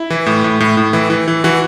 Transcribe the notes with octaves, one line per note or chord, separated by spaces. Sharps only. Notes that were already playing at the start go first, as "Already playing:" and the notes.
Already playing: E4
E3
A2
A2
A2
A2
E3
E3
E3
E3 F#4